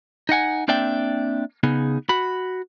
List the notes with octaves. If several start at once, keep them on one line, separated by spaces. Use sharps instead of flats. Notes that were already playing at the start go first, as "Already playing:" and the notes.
D#4 D#5 F#5 G#5
A#3 C4 D4 D5 E5 G5
C#3 B3 D#4 G#4
F#4 B5